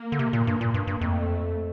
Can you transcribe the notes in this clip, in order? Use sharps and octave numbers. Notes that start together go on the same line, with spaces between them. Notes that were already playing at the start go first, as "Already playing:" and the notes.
Already playing: A#3
D3
C3
A#2
G2
A#2
G2
G2
F2 A3